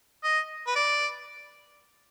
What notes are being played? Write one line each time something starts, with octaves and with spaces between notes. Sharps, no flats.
D#5
B4
D5